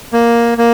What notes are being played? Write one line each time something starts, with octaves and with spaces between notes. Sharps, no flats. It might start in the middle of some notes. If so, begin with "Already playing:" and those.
A#3
A#3